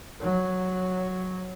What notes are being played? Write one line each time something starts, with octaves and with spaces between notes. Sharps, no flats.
F#3